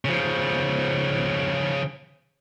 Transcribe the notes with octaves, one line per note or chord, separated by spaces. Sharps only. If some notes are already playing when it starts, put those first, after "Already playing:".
C#3 F3